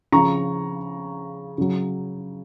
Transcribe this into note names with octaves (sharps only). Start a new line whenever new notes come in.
C#3 F3 A#5 C#6
C#3 F#3